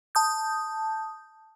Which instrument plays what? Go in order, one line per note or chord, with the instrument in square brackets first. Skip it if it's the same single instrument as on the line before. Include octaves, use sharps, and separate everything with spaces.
[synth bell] A5 D#6 G6